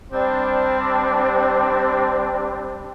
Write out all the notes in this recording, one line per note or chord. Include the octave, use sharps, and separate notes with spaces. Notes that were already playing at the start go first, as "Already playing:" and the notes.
G3 C4 D4